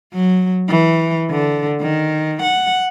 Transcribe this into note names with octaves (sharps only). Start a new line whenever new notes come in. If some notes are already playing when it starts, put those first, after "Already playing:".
F#3
E3
D3
D#3
F#5